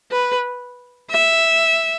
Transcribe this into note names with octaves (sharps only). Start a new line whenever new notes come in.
B4
E5